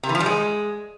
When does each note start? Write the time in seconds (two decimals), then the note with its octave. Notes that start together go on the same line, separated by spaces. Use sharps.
0.03 C3
0.09 E3
0.15 F3
0.20 G3
0.26 G#3